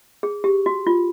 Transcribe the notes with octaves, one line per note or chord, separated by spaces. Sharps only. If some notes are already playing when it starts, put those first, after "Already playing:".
G#4
G4
F#4
F4